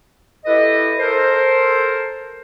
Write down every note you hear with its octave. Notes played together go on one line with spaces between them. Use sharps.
E4 G4 A4 B4 D#5
A4 A#4 C5